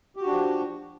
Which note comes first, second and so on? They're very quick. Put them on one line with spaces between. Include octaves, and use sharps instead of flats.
G4 F#4 D4 F3